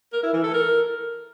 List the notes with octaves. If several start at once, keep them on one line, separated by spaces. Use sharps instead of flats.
A#4
E4
E3
A4
A#4